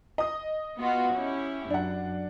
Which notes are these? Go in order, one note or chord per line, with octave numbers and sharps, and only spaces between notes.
D#5 D#6
B3 F4 F#4
C#4 E4 G4
F#2 D4 F#5